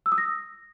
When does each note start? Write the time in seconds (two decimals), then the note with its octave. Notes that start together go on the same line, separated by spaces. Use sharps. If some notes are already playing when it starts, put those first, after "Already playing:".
0.06 E6
0.12 D#6
0.18 A#6